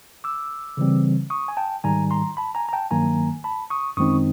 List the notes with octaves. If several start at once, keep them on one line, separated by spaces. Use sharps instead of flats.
D6 E6
C#3 E3 G3 C4
C#6 D#6
G#5
G5 A5
G#2 D#3 G3 G#5 A#5
A#5 C6
A5 B5
G#5 A#5
A#5
G5 A5
G2 D#3 F#3 A#3 G#5 A#5
A5 B5
C#6 D#6
F#2 D#3 G#3 C4 D#4 C#6 D#6